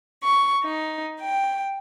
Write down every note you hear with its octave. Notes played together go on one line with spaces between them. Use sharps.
C#6
D#4
G5